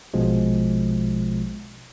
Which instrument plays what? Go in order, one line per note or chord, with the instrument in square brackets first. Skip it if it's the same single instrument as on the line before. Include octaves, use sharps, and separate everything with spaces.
[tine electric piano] A#1 B2 F3 G#3